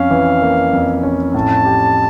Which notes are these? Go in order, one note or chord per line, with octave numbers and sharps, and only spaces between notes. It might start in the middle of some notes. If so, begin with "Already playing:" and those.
Already playing: F2 C#4 F5
E3
A#3
F2
C#4
A2 A5
G4